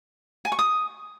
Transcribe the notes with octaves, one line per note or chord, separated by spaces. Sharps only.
G#5
C#6
D#6